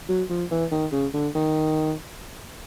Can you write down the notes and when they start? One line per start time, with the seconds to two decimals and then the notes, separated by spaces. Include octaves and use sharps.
0.08 F#3
0.30 F3
0.51 E3
0.71 D#3
0.92 C#3
1.14 D3
1.35 D#3